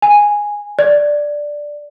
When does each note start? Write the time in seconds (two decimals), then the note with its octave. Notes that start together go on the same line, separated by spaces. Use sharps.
0.02 G#5
0.79 D5